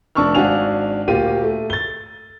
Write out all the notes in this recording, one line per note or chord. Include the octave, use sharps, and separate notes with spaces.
F1 D4 A5 C#6 E6 F6
G#1 D4 F#4 F5 G#5 F7
D2 A#2 A#3 F4 G4 D#7
A3
A6 G7